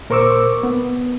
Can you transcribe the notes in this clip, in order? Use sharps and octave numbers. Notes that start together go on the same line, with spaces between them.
A#2 A#4 C5 C#6 D6 E6
B3